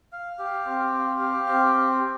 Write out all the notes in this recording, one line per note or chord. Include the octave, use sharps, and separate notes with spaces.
F5
G4
C4
F5
G4
C4